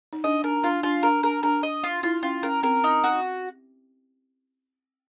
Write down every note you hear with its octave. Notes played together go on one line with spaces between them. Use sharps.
D#4
D4 D#5
D4 A#4
D4 F4
D4 F4
D4 A#4
D4 A#4
D4 A#4
D#5
F4
E4 F4
C#4 F4
C#4 A#4
C4 A#4
D#4
F#4